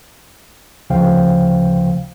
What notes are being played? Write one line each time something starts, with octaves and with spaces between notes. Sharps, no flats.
D2 C#3 F3 C5 F5 G5